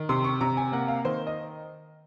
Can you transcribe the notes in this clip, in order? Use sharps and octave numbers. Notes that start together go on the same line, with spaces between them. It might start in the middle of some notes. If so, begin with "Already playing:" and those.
Already playing: D#3
C3 C6
C#6
C3 A#5
G#5
A#3 F#5
F5
D#3 C5
D#5